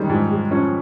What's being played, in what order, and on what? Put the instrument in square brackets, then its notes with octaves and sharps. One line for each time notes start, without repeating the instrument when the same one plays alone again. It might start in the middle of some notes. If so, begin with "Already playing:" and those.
Already playing: [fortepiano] D#3 C#4 [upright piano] G3 G#3
[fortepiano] G#2 [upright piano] F3
[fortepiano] G#3
[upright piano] F3 [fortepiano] C#4